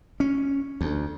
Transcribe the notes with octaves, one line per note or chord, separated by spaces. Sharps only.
C#4
D2